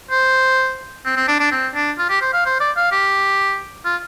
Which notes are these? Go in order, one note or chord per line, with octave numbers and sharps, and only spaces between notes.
C5
C4
C4
D4
D4
C4
D4
F4
G4
C5
F5
C5
D5
F5
G4
F4